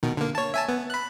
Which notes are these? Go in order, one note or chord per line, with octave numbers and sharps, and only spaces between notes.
B2 D#3
D3 A#3
C#5 A5
E5 G#5 A5
B3
B5 F#6